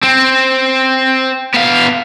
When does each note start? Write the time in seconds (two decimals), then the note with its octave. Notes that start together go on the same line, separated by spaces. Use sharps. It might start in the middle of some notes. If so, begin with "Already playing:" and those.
0.04 C4
1.54 B3 F5